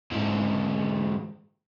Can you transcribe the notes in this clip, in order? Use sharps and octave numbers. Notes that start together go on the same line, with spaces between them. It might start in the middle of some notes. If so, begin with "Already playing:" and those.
G#2 E3